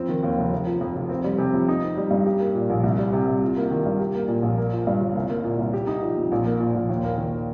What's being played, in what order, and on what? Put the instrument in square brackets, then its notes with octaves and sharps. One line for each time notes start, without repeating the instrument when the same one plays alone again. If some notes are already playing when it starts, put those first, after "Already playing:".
Already playing: [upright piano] F2 C4
D#3
D#2
F1
F1
F3
F2
F1
C4
G3
C3
F2
D#4
C4
G3
G2
G4
A#3
A#2
A#1
C2
G3
C3
C2
F4
A#3
D#3
G2
G4
A#3
A#2
A#1
A#3
F3
G2
G1
C2
A#3
A#2
C2
G4
D#4
F3
F2
A#1
A#3
A#2
A#1
D#2
A#3
D#3